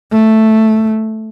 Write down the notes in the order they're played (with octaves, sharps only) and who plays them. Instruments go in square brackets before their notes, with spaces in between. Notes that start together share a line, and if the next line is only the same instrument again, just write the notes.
[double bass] A3